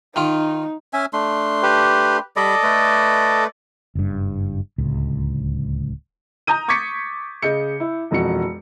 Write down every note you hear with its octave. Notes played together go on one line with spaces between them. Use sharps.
D#3 D#4 F4
C#4 E5 G#5
A3 D4 C6
G4 B4
G3 A4 D5 D#5 B5
A3 B4
F#1 G2
D1 C#2
A#5 D#6 G6 D#7
C#6 D6 G#6 A6 B6 C#7
C#3 D#5 G6 C#7
E4
E1 F2 F#4 C#7